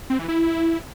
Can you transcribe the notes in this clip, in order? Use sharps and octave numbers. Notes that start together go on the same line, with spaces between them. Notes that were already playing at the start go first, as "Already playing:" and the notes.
C4
E3
E4